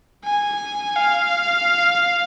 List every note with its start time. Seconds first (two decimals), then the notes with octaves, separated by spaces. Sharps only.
0.25 G#5
0.96 F5